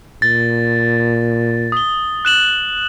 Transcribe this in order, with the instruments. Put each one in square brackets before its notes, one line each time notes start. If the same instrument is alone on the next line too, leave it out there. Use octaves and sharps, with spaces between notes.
[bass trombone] A#2 [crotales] A6
[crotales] D#6 G7
F#6 E7 F#7